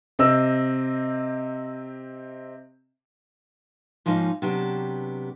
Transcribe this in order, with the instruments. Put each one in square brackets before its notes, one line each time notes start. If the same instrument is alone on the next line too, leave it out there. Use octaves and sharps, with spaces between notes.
[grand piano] C3 C4 D#5 E6
[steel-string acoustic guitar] G#2 F3 A#3 C#4 D#4
C3 F#3 B3 D4 G4